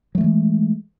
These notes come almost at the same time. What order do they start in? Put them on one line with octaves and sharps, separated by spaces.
F#3 A3 E3 G#3